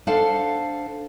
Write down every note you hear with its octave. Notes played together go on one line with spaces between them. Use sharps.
D4 A4 C5 F5 F#5